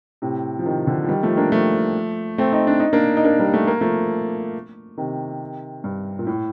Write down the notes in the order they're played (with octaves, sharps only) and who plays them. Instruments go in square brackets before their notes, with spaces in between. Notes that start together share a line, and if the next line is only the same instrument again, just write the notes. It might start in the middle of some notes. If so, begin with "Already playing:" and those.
[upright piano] A2 C3
F3
C3 D#3
D3 F3
F3
D#3 G3
F3 A3
A#3 D4
F3 A3
A3 C4
C4 D#4
D4
D#4
A#3 D4
D#4
A#3 D4
G3 A#3
A3
A#3
F3 A3
C3 D#3
G2
A#2
A2